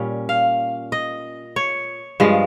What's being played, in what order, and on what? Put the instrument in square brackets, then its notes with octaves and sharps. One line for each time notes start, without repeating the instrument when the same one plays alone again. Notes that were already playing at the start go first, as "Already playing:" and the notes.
Already playing: [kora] A#2 G3 C#4 F5
F5
D#5
C#5
G2 F3 G#3